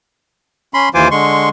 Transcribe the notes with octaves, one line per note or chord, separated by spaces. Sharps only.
C#4 B5 C6
D#2 E3 F4 C5 G#5 D6
D3 G#3 C6 C#6